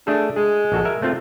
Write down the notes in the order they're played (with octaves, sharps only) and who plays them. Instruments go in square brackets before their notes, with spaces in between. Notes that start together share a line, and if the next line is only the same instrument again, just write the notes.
[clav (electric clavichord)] A3 G#4 A4 [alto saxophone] D4
[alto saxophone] G#3 [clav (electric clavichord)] G#4
[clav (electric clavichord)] A#1 F#4 A4
A#4 E5 G#5
A3 C4 F4